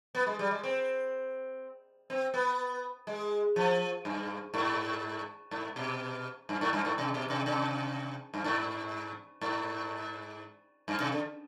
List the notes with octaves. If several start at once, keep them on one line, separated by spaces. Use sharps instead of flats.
B3
G#3
G3
G#3
C4
C4
B3
G#3
F3
G2
G#2
G#2
B2
G2
G#2
G2
G#2
C3
B2
C3
C3
G2
G#2
G#2
G2
C3
D3